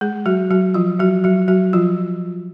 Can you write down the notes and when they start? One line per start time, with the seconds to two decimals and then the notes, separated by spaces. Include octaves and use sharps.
0.01 G#3 G#4
0.26 F#3 F#4
0.50 F#3 F#4
0.74 F3 F4
0.99 F#3 F#4
1.24 F#3 F#4
1.48 F#3 F#4
1.73 F3 F4